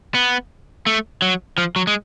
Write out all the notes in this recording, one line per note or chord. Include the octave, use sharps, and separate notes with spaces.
B3
A3
F#3
F3
F#3
G#3